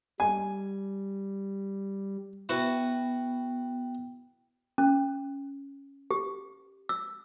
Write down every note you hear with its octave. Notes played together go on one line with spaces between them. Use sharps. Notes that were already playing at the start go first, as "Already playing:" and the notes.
G3 G#5
B3 E4 F#4 B4 G5
C#4
G4
E6